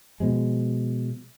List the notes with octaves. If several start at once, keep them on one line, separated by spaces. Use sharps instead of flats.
B2 F3 G#3